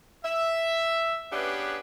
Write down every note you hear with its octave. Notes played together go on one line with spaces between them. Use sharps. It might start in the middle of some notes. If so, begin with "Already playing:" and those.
E5
B3 C#4 D4 G4 G#4 B4